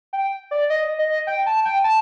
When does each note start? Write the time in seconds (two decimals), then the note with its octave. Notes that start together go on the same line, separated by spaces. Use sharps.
0.13 G5
0.51 D5
0.70 D#5
0.99 D#5
1.27 G5
1.46 A5
1.65 G5
1.84 A5